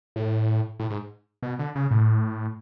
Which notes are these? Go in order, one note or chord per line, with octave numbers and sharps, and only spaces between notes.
A2
A2
G#2
B2
D3
C#3
A2